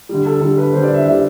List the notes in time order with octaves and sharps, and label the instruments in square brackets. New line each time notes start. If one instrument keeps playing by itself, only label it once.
[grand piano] D3 G3
A4
D3 G3 A4
B4
D3 G3 C5
D5
E5
D3 G3 E5